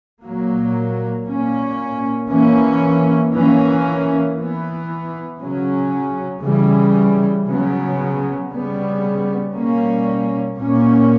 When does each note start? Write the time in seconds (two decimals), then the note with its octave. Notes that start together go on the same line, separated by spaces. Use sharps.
0.22 A#2 F#3 A#3
1.26 A#2 A#3 C#4
2.29 E3 A#3 C#4
3.33 E3 A#3 C#4
4.36 E3 B3
5.40 C#3 F#3 C#4
6.43 C#3 E3 G3
7.46 C#3 F#3 B3
8.50 C#3 G3 B3
9.54 B2 G3 A#3 C#4
10.58 A#2 A#3 C#4